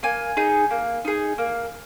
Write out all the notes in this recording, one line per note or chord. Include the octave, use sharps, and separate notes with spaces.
A#3 G#5
D#4 G#4
A#3
D#4 G#4
A#3